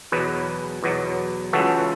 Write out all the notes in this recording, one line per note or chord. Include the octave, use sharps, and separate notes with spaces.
E2 B2 F#3 G#4 B4
E2 B2 F#3
C#2 C#3 E3 F#4 A4